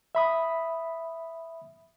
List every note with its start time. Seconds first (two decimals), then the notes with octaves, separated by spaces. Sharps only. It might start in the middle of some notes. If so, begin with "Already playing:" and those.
0.15 E5 B5 D#6